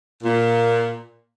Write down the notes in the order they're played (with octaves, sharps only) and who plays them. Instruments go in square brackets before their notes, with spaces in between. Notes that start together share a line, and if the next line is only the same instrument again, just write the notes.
[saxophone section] A#2